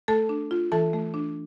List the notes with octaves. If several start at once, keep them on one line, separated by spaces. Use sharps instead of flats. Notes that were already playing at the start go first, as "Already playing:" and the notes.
A3 A4 A5
D4
F4
E3 A4 A5
A3
D4